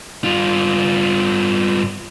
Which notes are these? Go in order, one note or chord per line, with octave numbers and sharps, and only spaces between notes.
G2 F4